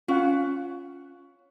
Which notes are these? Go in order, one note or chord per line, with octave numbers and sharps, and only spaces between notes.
C#4 F4 F#5